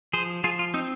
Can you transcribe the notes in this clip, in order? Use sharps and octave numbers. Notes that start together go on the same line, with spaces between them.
F3 G#4 C5
F3 F4 G#4
F4
C4 D#4